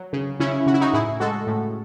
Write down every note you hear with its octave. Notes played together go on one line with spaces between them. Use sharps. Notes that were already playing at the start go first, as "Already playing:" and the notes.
Already playing: F#3
C#3
C#3 C#4 E4
C#3 F#4
E4
D#4 F#4
A2 E4 G#4
G#3 F#4 A4
A2